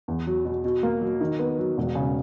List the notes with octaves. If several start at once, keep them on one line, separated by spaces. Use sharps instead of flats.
E2
F#3
B2
B2
A#3
F#3
D#3
B3
F#3
E1
C#3